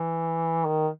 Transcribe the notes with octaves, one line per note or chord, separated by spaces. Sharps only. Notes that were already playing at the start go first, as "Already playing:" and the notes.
Already playing: E3
D#3